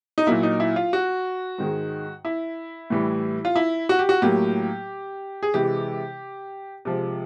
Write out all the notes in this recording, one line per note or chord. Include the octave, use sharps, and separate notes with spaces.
D#4
A#2 F#3 A#3 E4
D#4
E4
F4
F#4
G#2 D#3 G#3
E4
A2 E3 G3
F4
E4
F#4
G4
F#4
A2 F#3 A#3 G4
G#4
C3 E3 G#3 G4
C3 F3 G#3